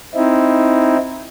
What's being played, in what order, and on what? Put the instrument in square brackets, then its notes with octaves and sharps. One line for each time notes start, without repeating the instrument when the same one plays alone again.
[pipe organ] C4 D#4 E4